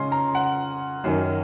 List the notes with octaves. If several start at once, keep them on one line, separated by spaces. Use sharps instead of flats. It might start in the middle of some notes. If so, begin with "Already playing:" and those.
Already playing: C#3 G#3 C#4 C6
A#5
F#5
F#2 D#3 F#3 C#4